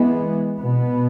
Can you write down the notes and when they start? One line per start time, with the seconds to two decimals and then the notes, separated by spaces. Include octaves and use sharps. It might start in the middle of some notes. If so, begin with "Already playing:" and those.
Already playing: E3 G#3 B3
0.58 B2 B3